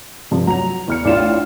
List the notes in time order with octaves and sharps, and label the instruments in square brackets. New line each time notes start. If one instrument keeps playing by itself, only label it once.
[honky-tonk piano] G2 C3 F3
[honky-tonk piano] F#3 F7 [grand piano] A#5
[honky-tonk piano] E2 F6 C#7
[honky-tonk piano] A1 E4 E7 [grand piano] D4 F4